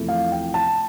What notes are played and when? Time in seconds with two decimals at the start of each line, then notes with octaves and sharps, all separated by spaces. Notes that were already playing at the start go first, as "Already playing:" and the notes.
Already playing: E2 C3 F3 A3 E4
0.09 F5
0.32 G5
0.54 A5